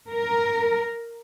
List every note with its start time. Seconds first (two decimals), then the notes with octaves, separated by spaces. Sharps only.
0.11 A#4